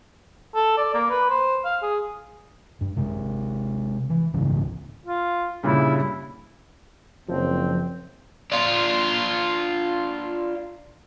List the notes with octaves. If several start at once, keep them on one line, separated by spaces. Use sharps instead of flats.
A4
D5
A#3
B4
C5
F5
G#4
G2
C3 G#3
E3
C2 G#2 C#3 E3
F4
G2 A#2 C#3 E4
F#1 F3 C4
D4 F4